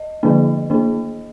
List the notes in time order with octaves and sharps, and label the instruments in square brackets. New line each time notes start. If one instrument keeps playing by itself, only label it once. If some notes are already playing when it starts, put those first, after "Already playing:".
Already playing: [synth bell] D#5
D3 F3 A#3 D4
D#3 A#3 D4